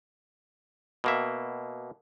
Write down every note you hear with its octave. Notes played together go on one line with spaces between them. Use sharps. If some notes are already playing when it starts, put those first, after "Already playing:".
B2 A#3 E5